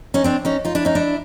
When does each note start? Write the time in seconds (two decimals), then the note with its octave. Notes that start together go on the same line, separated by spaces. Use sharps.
0.14 C#4 D#4
0.24 C4 D4
0.45 C#4 D#4
0.65 D#4 F4
0.75 D4 E4
0.85 C#4 D#4
0.95 D4 E4